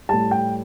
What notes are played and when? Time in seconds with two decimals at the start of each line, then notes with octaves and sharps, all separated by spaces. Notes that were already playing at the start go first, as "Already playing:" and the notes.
0.09 A2 G3 A5
0.31 G5